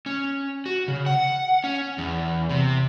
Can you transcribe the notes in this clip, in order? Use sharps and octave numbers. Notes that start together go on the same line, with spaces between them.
C#4
F#4
C#3
F#5
C#4
E2
C3